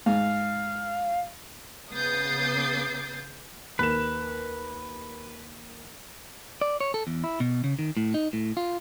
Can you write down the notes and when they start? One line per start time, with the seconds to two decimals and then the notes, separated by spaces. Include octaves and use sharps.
0.06 G#2 F5
1.93 C#3 B3 D#6 G6 A6 C7
3.79 D#2 A#4 B4 E7
6.61 D5
6.80 C#5
6.94 A4
7.07 E2
7.24 E4
7.40 B2
7.64 C#3
7.79 D#3
7.97 A2
8.14 D#4
8.33 A2
8.57 F4